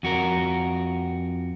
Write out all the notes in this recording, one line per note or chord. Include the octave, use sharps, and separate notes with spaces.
F2 F#4 A#4